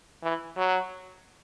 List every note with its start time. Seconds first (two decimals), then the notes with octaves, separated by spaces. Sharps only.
0.23 E3
0.57 F#3